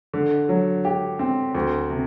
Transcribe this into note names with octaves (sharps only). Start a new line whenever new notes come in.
D3
F#3
G4
C4
D2
C3